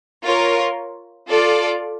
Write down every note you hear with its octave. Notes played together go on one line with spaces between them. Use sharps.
F4 A#4 C#5
F4 A4 D5